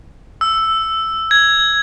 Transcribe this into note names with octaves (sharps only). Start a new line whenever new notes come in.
E6
G#6